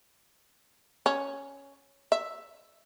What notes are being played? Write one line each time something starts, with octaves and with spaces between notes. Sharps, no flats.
C#4
E5